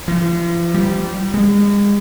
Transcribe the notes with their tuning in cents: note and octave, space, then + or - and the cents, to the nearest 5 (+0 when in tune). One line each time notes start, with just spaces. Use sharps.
F3 -40
G3 -20
G#3 -35